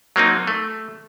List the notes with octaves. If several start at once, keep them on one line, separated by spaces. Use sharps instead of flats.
F#3 A#3 C4 D#4
A3